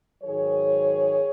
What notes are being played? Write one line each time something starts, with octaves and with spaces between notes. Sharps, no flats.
G#2 D#3 F#3 G#4 C#5